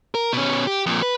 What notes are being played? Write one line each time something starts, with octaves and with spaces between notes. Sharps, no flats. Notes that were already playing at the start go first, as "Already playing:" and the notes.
A#4
B2 C#4
G4
F2 A#2
B4